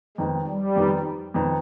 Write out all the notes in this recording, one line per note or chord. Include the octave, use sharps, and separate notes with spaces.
F2 D#3 G#3 B3 D#4
G3
F2 D#3 B3 D#4
F2 D#3 B3 D#4